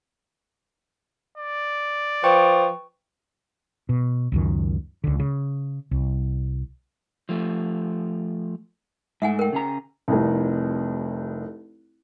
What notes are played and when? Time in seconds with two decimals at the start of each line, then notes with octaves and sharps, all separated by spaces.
1.38 D5
2.24 F3 B4 G5 C#6
3.89 B2
4.32 C#2 F#2 D#3
5.04 C#2 D3
5.20 C#3
5.91 C2
7.29 F3 A3
9.22 G#2 A3 E5 F#5 G#5
9.39 A#4 G5
9.53 C#3 G#4 A#5
10.08 F1 C2